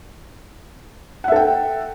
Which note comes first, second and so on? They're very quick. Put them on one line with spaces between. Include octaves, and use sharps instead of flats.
F#5 E5 A4 G5